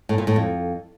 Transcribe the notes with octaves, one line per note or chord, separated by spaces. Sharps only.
A2
A#2
A2
F2